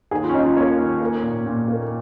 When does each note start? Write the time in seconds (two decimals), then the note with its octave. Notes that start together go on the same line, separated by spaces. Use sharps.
0.11 D#2 G#4
0.23 F4
0.29 C#4
0.33 D#2 D#4
0.45 F4
0.57 A#3 C#5
0.78 D#3
1.01 A#3
1.23 A#2
1.46 A#2
1.68 A#3